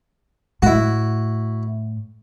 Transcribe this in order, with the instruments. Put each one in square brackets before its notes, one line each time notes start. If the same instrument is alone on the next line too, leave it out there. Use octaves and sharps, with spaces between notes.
[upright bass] A2 [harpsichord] E4 F#4